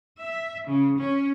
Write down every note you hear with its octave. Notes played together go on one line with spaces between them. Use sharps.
E5
C#3
C#4